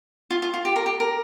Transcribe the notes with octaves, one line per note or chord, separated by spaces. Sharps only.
F4
F4
F4
G4
A#4
G4
A#4